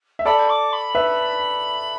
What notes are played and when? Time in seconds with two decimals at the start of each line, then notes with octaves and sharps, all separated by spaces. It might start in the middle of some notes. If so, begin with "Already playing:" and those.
0.19 E5
0.25 A4 D5 B5
0.49 D6
0.72 B5
0.95 B4 E5